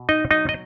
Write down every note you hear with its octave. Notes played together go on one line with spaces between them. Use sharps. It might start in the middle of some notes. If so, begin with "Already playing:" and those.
Already playing: B2
D#4 D#5
F#3 D#4 D#5
D#5